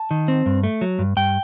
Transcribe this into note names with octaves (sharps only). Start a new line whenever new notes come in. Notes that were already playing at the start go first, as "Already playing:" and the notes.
Already playing: A5
D#3
C4
G2
A3
F#3
G2
G2 G5